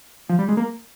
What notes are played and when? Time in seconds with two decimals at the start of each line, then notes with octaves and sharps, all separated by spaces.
0.29 F3
0.39 G3
0.49 G#3
0.57 A#3